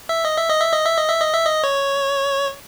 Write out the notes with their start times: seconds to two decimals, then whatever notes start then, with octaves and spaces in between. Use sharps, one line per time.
0.09 E5
0.25 D#5
0.37 E5
0.49 D#5
0.61 E5
0.73 D#5
0.85 E5
0.98 D#5
1.09 E5
1.21 D#5
1.33 E5
1.45 D#5
1.64 C#5